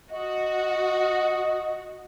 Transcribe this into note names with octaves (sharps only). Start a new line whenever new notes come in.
F#4 D#5